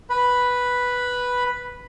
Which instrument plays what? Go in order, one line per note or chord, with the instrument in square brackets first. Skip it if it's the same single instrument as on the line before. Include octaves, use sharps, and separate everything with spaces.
[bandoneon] B4 B5